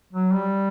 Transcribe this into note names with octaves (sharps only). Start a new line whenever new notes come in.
F#3
G3